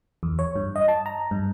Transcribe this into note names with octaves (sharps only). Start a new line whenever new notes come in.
E2
C#5
G2
D#5
A5
A#5
G2